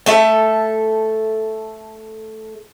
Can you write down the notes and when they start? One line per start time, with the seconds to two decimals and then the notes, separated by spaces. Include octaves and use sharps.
0.06 A3 A4 E5